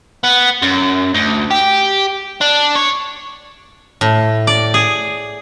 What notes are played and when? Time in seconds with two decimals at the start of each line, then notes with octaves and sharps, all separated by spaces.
0.24 B3
0.62 F#2
1.14 D2
1.51 G4
2.41 D4
2.76 C#5
4.01 A2
4.47 D5
4.74 G#4